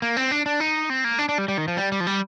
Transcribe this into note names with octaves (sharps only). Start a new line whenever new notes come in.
A#3
C4
D4
D4
D#4
C4
A#3
D4
D4
G3
G3
D#3
F3
G3
G3
F3
G3